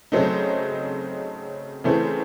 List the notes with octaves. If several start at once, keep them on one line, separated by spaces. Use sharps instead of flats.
C#3 F#3 A3 C4 D#4
C#3 E3 A3 C4